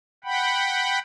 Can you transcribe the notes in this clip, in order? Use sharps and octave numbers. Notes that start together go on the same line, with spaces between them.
F#5 G5 B5